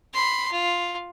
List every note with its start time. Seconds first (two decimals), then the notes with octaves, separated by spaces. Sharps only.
0.14 B5 C6
0.51 F4